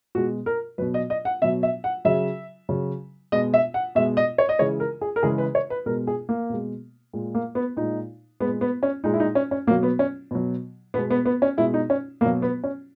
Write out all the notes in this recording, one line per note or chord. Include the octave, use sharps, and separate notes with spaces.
B2 G#3 F#4
A#4
B2 F#3 B4
D#5
D#5
F#5
B2 F#3 E5
E5
F#5
C#3 F#3 E5
C#3 F#3
B2 G#3 D#5
E5
F#5
B2 G#3 E5
D#5
C#5
D#5
C#3 E3 G#3 C#5
A#4
G#4
A#4
C#3 E3 G#3 G#4
B4
C#5
B4
B2 G#3 A#4
G#4
A#3
B2 G#3
A#2 G#3
A#3
B3
A#2 G#3 D#4
A#2 G#3 B3
B3
C#4
A#2 G#3 D#4
E4
D#4
C#4
C#4
B2 F#3 A#3
B3
C#4
B2 F#3
B2 G#3 B3
B3
B3
C#4
B2 G#3 E4
D#4
C#4
B2 F#3 A#3
B3
C#4